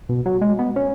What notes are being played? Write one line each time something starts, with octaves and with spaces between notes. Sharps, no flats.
B2
F#3
G#3
B3
C#4